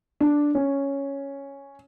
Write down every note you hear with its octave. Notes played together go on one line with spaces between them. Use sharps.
D4
C#4